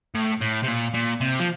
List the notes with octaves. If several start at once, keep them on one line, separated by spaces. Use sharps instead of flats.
A2
A2
C3
A#2
A#2
C3
F3